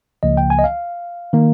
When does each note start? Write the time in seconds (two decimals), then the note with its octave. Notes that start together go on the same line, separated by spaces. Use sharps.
0.23 C#2 C#3 F3 A#3 D#5
0.37 G5
0.50 G#5
0.59 D#5
0.64 F5
1.33 D#3 A#3